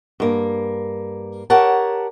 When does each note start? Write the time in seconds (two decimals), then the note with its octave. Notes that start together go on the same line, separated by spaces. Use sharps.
0.20 G2 A#3
1.50 G4 A#4 C#5 F#5 A5